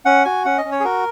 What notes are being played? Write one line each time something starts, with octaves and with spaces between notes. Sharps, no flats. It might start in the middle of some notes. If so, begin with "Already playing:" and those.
C#4 F#5
F#4 G#5
C#4 F#5
D#5
C#4
C#5
G#4
F#4 A#4